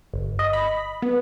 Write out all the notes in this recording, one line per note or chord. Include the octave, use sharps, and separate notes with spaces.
G1
D#5
B5
B3